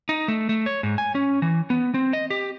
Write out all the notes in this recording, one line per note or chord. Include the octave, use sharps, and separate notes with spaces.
D#4
A3
A3
C#5
G#2
G#5
C#4
E3
B3
C4
D#5
G4